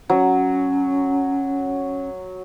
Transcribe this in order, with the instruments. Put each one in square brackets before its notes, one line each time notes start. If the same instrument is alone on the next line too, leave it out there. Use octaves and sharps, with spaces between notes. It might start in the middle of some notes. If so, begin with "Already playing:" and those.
[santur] F#3 [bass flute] C#4